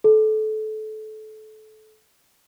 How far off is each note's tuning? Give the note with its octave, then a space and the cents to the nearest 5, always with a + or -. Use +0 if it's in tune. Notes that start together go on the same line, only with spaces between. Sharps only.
A4 -25